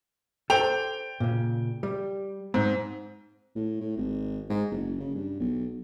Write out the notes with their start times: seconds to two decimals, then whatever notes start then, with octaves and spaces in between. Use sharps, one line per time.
0.50 A4 C5 D5 G5 F7
1.20 A#2 C#3
1.83 G3
2.54 G#2 C4
3.55 A2
3.81 A2
3.97 G#1
4.49 G#2
4.71 F#1
5.00 C#3
5.15 G2
5.40 B1